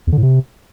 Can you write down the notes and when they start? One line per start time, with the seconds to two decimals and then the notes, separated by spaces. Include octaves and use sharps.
0.07 E2
0.12 D3
0.18 A2
0.23 C3